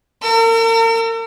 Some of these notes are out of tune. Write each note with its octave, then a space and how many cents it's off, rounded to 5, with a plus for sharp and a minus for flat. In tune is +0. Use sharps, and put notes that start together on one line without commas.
A#4 -40 E6 +40